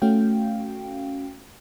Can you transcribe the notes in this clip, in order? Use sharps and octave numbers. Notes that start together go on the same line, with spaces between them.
A3 C#4 F#4 F5 G5